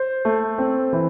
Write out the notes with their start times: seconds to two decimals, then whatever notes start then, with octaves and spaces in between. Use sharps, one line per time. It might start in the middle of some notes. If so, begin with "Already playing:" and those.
Already playing: C5
0.25 A3
0.58 C4
0.93 E3